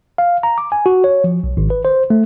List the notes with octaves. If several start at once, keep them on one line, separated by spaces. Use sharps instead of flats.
F5
A#5
D6
G#5
F#4
C#5
F3
B1
G#1
B4
C5
A3